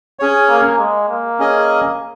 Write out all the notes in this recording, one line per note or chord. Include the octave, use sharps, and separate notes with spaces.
C#4 G#4 C#5
A#3
G#3
A#3
C#4 G#4 D#5 G#5